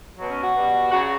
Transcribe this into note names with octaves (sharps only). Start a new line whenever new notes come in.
B2 F#3
C#4
F#4
B2 G3
C#3 F#3 F#4